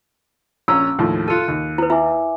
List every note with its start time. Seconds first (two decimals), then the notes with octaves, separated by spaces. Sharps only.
0.68 A#1 C#4 A#5 E6
0.99 D#2 A2 F3
1.28 F4 A4 F#6 C#7 D#7
1.48 D#2
1.78 E4 B4
1.90 E4 E5 G#5 D6